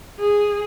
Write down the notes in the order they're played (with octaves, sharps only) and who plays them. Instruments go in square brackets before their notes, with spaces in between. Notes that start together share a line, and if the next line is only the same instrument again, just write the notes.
[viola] G#4